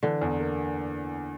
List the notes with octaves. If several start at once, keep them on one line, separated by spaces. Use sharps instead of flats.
D3 E3
E2
A#3